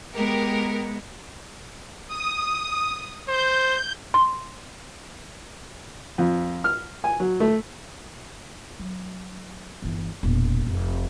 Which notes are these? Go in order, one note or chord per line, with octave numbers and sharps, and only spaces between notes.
G#3 B3 G4 A#4
D#6
C5 G6
C6
F2
F6
G#5
F#3
A3
F#3
G1 E3
E1 A#2
F1